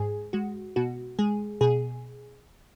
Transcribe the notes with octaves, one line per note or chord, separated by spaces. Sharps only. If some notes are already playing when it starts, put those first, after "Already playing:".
Already playing: G#2 G#4
G#3 F#4
B2 F#4
G#3 G#4
B2 G#4